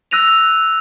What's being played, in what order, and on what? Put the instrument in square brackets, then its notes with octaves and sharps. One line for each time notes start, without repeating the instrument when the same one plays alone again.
[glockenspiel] E6 F#6 A#6 D#7 F7